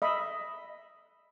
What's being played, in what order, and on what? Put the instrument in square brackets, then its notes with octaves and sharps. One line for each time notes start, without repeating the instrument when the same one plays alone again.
[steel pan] D#5 E5 B5